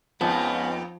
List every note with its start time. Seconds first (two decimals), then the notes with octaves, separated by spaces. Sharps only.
0.21 F2 F3 G#3 B3 C#4 D#4